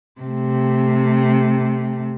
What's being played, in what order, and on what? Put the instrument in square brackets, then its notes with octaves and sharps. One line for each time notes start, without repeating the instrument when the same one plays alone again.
[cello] C3 A3